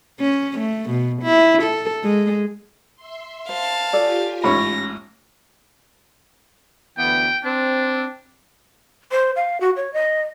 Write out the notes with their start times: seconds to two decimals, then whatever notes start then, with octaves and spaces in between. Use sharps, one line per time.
0.20 C#4
0.59 A3
0.90 B2
1.22 E4
1.62 A4
2.04 G#3
2.96 E5 C6
3.49 C5 F5 A5
3.93 F4 G4 A4 C#5 D5 G#5
4.44 A1 G#2 C#4 C#5 B5 A#6
6.98 D2 E3 B3 G5
7.44 C4 D4
9.12 C5
9.36 F5
9.61 F#4
9.76 C#5
9.93 D#5